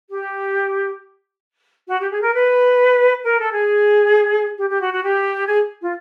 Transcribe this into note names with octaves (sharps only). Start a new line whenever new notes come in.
G4
F#4
G4
G#4
A#4
B4
A#4
A4
G#4
G4
G4
F#4
F#4
G4
G#4
F4